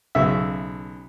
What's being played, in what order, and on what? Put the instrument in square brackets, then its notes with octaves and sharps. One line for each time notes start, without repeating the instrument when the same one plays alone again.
[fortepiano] B1 C#3 E5